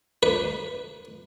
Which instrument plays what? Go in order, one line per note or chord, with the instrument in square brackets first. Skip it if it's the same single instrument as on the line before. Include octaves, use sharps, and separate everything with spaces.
[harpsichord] B4